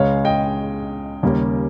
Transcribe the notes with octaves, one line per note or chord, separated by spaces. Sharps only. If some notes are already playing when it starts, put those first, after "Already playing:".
Already playing: C#2 C#3 G#3 C#5 F5
D#5 G5
D#2 C#3 G3 A#3 C#4